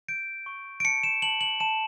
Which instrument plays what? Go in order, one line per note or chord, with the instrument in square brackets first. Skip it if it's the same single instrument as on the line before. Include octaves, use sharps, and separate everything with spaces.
[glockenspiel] G6 D7
C#6
D7
A5 C#7
E7
A5 F#7
F#7
A5 E7